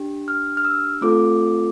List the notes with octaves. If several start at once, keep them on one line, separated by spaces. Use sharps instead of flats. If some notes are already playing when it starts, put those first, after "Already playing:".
Already playing: D4 G4
F6
F6
E6
A3 C4 F4 A4 D6